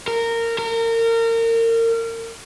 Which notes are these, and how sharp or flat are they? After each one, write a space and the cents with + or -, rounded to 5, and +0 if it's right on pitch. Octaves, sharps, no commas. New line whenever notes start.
A#4 -15
A#4 -30